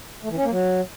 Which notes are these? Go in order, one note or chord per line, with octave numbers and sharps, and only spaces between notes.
A3
E3
C#4
A#3
F#3